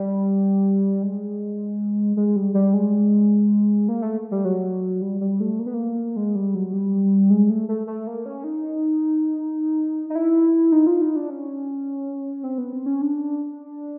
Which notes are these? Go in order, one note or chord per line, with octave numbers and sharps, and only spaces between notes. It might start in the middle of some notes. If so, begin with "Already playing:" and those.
Already playing: G3
G#3
G#3
G3
G3
G#3
A#3
A3
G3
F#3
G3
G3
A3
A#3
B3
A#3
G#3
G3
F#3
G3
G#3
A3
A3
A3
A#3
C#4
D#4
D#4
E4
D#4
F4
D#4
D4
C#4
C4
B3
C4
C#4
D4